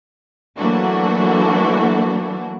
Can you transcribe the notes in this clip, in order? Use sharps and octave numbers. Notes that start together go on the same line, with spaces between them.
E3 F#3 A3 A#3 D4 F#4